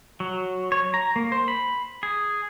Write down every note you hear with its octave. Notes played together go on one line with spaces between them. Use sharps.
F#3
C#5
A#5
A#3
C5
B5
G#4